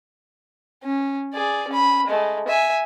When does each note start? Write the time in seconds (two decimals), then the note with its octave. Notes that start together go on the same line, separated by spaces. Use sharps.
0.84 C#4
1.34 G#4 D5
1.68 C#4 B5
2.07 G#3 A3
2.48 E5 G#5